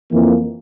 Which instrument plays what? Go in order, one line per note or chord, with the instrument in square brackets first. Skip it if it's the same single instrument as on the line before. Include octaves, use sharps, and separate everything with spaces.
[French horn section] F2 E3 A#3